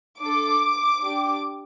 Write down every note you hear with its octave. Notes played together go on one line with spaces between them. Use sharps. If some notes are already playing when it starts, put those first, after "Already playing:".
D4 A4 D6
D4 G4